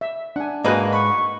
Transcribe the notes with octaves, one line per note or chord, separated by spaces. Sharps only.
E5
D4 F#5 G#5
G#2 A#3 F#4 B4 D5 D#5 G#5 F#6
F#5 B5 C#6